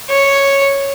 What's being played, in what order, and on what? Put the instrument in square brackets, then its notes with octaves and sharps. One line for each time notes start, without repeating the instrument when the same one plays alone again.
[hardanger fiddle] C#5